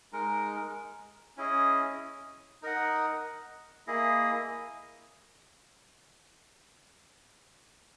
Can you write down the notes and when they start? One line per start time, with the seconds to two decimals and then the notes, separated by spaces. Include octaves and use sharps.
0.12 G#3 D#4 A#4
1.37 C#4 E4 G#4 D#5
2.63 D#4 A#4 D#5 F#5
3.87 A#3 E4 G#4 D#5